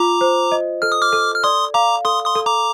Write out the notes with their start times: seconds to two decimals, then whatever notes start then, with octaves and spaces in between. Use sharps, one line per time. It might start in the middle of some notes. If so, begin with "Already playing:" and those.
Already playing: F4 A#5 D6
0.21 C5
0.52 D#5
0.82 A4 F6
0.92 D#6
1.02 D6 F6
1.13 A4
1.34 F6
1.44 D5 C6 D#6
1.74 F5 A#5 D6
2.05 A4 C6 D#6
2.25 C6 D#6
2.35 A4
2.46 A#5 D6